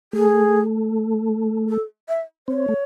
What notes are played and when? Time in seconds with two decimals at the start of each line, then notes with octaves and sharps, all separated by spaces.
0.13 A3 G#4
1.69 A4
2.09 E5
2.48 C4 C#5
2.68 A3